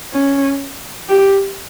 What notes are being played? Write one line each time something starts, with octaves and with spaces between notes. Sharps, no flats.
C#4
G4